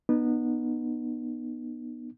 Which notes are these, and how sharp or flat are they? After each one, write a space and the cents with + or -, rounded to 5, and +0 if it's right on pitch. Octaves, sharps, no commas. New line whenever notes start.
B3 -15 D#4 -30